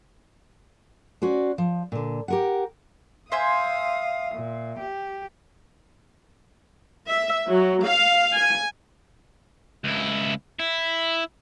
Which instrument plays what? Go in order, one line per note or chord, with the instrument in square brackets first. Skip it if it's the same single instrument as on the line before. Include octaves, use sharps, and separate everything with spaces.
[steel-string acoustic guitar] C#4 F#4 C5 D5
F3
A#2 D3
G4 A#4 F#5
[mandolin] C5 E5 G#5 [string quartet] F5 D#6
[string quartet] A#2
G4
[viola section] E5
F#3
F5
G#5
[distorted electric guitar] C#2 E4
E4